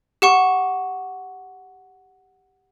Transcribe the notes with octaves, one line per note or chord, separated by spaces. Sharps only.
G4 F#5 C#6